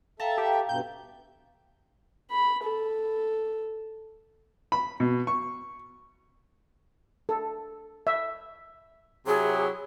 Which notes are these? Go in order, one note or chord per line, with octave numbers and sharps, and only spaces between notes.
A4 E5 F5 G5 A5 A#5
G4
G2 B2 G6
B5
A4
B5
B2
C#6
A4
E5
C3 F#3 E4 G#4